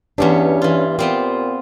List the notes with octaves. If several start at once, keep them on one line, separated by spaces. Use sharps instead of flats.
E2 G2 B3 C#4 D4 G4
E3 F4
A#2 B3 C4 F4 G4